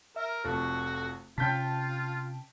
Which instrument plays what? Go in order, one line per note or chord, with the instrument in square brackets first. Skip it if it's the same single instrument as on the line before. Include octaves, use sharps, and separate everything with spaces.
[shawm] A#4 [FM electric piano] E5
[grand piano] F1 F2 C#6 [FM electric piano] F4 A4 [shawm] F#4
[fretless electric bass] C3 C#4 [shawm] F4 [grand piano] G5 G6 B6 [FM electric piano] A5